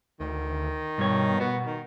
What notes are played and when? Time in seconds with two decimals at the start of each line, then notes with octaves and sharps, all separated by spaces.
0.20 D2 D#3
0.98 G2 B2 C#5
1.40 B3 F#4
1.67 D#3